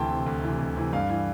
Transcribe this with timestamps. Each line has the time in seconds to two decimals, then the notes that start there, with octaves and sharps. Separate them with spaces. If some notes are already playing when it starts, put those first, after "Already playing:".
Already playing: D2 C3 E3 G5 A5 C6
0.10 C3 E3
0.26 D2
0.43 C3 E3
0.59 D2
0.76 C3 E3
0.93 G2 F5
1.10 E3